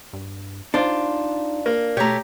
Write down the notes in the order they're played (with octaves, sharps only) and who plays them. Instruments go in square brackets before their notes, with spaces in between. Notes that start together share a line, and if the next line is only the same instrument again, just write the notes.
[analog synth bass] G2
[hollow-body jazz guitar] D4 F4 [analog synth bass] D#4 [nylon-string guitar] C5
[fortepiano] A#3
[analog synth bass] B2 [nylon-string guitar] A3 C#5 [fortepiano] G4 A#5